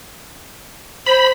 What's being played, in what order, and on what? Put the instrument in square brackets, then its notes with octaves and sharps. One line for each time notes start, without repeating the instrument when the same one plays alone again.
[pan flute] C5 [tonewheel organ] B5